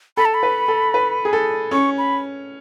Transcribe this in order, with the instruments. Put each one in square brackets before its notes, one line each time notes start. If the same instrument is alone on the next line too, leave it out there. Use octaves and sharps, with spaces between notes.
[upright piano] A4 [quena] B5
[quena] A5
B5
[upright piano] B4
A4
B4
G#4
A4
[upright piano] C#4 [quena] C#6
[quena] B5